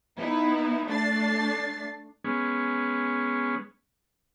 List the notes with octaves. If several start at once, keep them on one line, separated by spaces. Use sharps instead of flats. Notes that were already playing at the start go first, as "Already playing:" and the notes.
B3 D#4 E4
A3 D4 A6 C7
G#3 B3 C#4